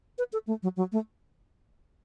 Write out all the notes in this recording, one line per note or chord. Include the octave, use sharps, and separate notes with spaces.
B4
A4
A3
F#3
F#3
A3